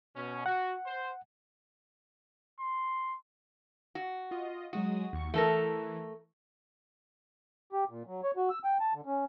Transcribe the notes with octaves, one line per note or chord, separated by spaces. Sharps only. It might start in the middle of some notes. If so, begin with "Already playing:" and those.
B2 C#4
F#4 F#5
C5
C6
F#4
F4 D#5
F#3 G#3 F#4 D#6
D#2 C#6
E3 A3 A4 A#4
G4
A#2
F#3
C#5
F#4
E6
G5
A5
D3
C#4